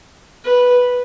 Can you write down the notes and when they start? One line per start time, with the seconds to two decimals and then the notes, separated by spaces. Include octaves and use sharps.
0.44 B4